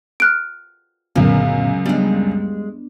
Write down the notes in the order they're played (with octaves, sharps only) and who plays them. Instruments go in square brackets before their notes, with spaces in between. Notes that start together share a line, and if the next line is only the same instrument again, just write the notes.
[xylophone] F6 F#6 D7
[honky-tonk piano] C#2 F#2 [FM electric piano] A#2 D3 B3 [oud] A#3
[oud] G3 G#3 [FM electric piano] B3 D4